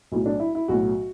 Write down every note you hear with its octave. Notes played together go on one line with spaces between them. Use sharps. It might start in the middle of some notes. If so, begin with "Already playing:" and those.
B1 A2 F#3
D4
E4
E4
B1 A2 F#3 F#4